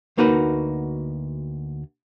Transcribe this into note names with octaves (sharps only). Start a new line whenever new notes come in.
D2 A#3 D#4 F#4 B4